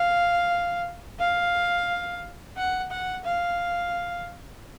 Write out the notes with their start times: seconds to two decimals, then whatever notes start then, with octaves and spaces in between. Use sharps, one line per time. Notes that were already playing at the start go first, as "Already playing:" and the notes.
Already playing: F5
1.19 F5
2.57 F#5
2.91 F#5
3.24 F5